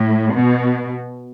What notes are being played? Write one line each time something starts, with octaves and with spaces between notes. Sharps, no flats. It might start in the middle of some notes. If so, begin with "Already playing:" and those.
Already playing: A2
B2